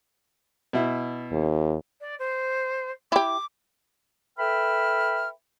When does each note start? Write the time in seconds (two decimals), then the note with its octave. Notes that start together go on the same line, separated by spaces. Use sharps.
0.73 B2 E4
1.32 D#2
2.01 D5
2.19 C5
3.12 E4 G4 D6
4.38 A4 B4 E5 G5 B5 F6